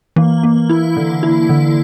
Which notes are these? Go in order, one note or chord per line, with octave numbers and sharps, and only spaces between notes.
E3 A#3
A#3
E4
D3
E4
D3